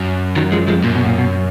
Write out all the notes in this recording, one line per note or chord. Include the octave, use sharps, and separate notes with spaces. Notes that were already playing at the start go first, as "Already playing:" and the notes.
Already playing: F#2
D#3 F#3
F3 G#3
F3 G#3
F2
F#2 A#2
B2
A#2
B2